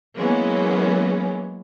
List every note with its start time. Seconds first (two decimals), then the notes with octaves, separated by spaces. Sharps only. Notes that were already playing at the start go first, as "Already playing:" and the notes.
0.15 E3 F#3 G#3 A#3 B3 C#4